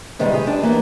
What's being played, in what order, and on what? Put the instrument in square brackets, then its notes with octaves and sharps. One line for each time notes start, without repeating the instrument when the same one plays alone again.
[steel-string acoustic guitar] C3 D#3 G3 G#3 B3
G4 G#4
D4
E3 A#3 B3